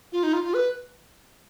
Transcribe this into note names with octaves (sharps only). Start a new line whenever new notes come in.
F4
D#4
F4
F4
B4